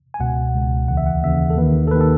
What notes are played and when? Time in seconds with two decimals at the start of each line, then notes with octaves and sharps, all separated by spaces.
0.14 G#5
0.20 C#2 B2 F#5
0.54 C#2 B2
0.88 D#2 C#3 E3 F#5
0.97 E5
1.06 F#5
1.23 D#2 C#3 E3 E5
1.50 A4
1.57 D#2 D#3 B4
1.87 A4
1.91 D#2 D#3 B4
2.01 A4